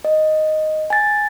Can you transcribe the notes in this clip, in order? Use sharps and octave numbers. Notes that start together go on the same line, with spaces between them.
D#5
G#5 A6